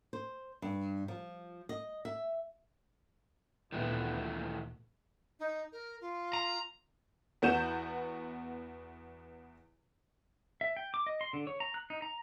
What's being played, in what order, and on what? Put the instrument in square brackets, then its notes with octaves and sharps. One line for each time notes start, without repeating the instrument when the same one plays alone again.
[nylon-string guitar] C5
G2
F3
D#5
E5
[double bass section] D2 A#2 B3 [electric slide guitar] D#3 E3 A3
[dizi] D#4
A#4
F4
[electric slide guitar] A#5
[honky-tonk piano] E2 B3 F#4 G6 E7
[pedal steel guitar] E5
G5
D6
D#5
C6
D3
C#5
A#5
F#6
D#4
A#5